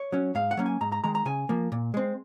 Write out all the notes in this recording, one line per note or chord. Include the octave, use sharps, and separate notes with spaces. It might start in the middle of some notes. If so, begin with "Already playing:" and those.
Already playing: C#5
F#3 C#4
G#2 F5
F#5
F#3 A#3 C#4
G#5
G#2 A#5
A#5
D#3 G#3 A#5
A#5
C#3 G#5
F3 A#3
A#2
G#3 C4